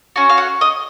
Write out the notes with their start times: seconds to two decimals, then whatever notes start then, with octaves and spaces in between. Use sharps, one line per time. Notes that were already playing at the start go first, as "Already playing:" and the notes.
0.16 C#4 F#4
0.29 F5
0.38 F#5
0.61 D#5